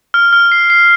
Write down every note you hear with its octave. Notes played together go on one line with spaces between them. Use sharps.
F6
F6
C7
C7